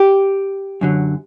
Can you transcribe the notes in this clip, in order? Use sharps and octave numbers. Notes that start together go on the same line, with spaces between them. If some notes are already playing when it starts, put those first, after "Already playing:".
Already playing: G4
F#2 D3 F#3